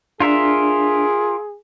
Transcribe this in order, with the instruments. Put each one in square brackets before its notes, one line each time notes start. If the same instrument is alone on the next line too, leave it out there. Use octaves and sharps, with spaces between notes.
[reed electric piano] D4 [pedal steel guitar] F4 A#4 E5 [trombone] G#4